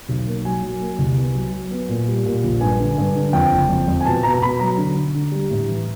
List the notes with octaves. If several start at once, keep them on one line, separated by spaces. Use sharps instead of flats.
B1
A#3
F#3 G#5
F#3
A#3
C2
B3
F#3
F#3
B3
A#2
G3
A#2
A#1
G2 G#5
D3
G2
D3
F2 G5
F#1
F2
F2
G#5
B2 A5
B2 A#5
A#5
B2 B5
F#3 A#5
D3
D3
D3
G3
A2
E3